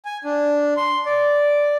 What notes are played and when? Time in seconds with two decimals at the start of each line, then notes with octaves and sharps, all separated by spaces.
0.05 G#5
0.24 D4
0.77 C6
1.06 D5